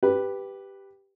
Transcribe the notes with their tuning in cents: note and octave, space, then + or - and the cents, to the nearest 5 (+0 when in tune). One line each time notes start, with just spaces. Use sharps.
G4 +0 B4 +0